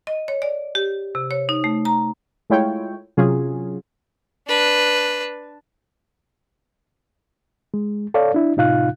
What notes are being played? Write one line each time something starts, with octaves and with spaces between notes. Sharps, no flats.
D#5
C#5
D5
G4
C3
C#5
D#4
A3
A#5
G#3 A3 E4 F4 C#5 G5
C3 F#3 C#4 F4 G#4
D4 B4
G#3
A4 C#5 D5 F5
D4 E4
A2 C3 D#4 F4 F5 F#6